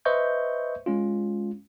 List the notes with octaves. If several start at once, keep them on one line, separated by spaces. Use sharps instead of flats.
B4 C5 D#5 E5 C#6 G6
G#3 C#4 F4